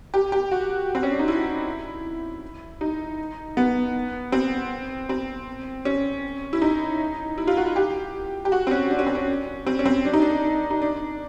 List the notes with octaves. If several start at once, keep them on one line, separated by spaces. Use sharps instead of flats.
G4
G4
F#4
C4
C#4
D4
D#4
E4
D#4
B3
C4
C4
C#4
E4
D#4
E4
F4
F#4
G4
G4
F#4
C4
C#4
D4
C#4
C4
C#4
C4
C#4
C4
D4
D#4
D4
D#4
D4